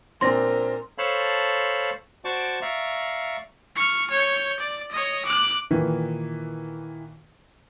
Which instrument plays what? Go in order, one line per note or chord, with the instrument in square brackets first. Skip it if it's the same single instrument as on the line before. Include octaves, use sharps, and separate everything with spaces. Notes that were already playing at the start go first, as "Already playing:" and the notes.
[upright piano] A#2 C4 D4 [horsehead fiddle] A#4 [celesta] C6 A#6
[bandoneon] A4 C5 C#5 F5 A5 B5
F#4 C5 D5 A5 C#6 D6
D5 E5 F5 A#5 C#6
[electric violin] C#6 F6
C#5 G6
D5
C#5 D#5
D6 F#6
[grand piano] A#2 D#3 E3